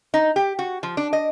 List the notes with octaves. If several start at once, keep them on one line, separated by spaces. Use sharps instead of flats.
D#4
G4
F#4
F3
D4
D#5